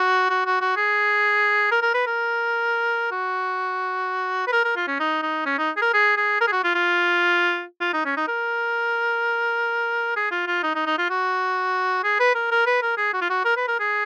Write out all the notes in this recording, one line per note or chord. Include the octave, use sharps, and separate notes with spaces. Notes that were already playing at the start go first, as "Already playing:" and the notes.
Already playing: F#4
F#4
F#4
F#4
G#4
A#4
A#4
B4
A#4
F#4
B4
A#4
A#4
F4
C#4
D#4
D#4
C#4
D#4
G#4
A#4
G#4
G#4
A#4
G#4
F#4
F4
F4
F4
D#4
C#4
D#4
A#4
G#4
F4
F4
D#4
D#4
D#4
F4
F#4
G#4
B4
A#4
A#4
B4
A#4
G#4
F#4
F4
F#4
A#4
B4
A#4
G#4